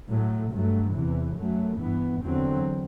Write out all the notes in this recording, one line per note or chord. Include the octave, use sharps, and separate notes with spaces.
A2 F#3 A3
G2 F#3 A3
E2 C3 E3
F#2 F#3 A3
G2 E3 B3
E2 D3 F#3 C4